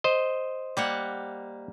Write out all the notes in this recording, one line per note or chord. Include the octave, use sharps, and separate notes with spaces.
C5 D#5
G3 A#3 F#5